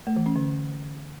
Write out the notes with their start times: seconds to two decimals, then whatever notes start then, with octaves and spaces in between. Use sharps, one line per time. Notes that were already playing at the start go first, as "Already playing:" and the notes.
0.07 A3
0.16 E3
0.26 C#4
0.36 D3